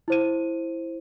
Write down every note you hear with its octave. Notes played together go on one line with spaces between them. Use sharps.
E4 C5 D#7